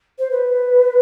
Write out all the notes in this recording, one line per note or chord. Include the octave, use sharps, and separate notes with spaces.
C5
B4